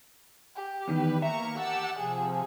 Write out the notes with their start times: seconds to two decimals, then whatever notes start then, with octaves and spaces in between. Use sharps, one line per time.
0.56 G4
0.88 E2 D#3 G3 B4
1.22 A#3 E5 A#5 C#6
1.56 G4 F#5 A5 E6
1.98 C3 F3 G#4